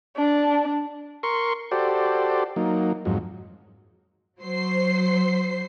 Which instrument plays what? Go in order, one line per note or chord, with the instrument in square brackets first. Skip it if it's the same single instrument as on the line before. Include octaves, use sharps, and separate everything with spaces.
[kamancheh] D4 A5
[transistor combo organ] A#4 C6 C#6
F#4 G4 A4 C5 D5
F#3 A#3 D#4
F2 G#2 F#3
[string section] F#3 C5 C7